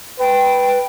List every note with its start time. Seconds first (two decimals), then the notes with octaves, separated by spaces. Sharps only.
0.19 B4 G5